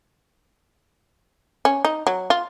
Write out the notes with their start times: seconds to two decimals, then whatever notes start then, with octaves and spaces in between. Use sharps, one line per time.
1.65 C#4
1.85 D#4
2.07 F#3
2.30 F4